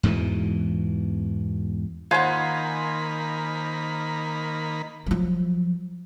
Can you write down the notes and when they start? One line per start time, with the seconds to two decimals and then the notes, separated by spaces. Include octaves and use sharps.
0.03 E2 G#2 B2 E3
2.11 D#3 A#3 F4 C5 F#5 G#5 B5
5.06 F3 F#3